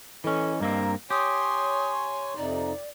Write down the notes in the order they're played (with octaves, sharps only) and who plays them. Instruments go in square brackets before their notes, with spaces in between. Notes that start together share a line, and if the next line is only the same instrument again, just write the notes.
[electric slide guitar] E3 C#4 [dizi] A4 [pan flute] D#5
[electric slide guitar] G2 A#3 C4 [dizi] A#5
[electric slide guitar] G4 [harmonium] C#5 G#5 [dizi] C6 [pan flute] D#6
[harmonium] F2 C3 D#4 [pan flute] D5